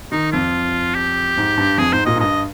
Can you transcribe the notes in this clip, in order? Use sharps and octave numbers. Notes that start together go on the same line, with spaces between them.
D#3 D#4
F2 F4
G4
G#2
G2
F2 G#4
G#2 C5
A#2 D#5
G#2
G2 D#5